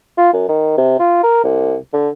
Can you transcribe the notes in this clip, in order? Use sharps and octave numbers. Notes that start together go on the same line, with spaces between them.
F4
F#2
D#3
C3
F4
A#4
C2
D3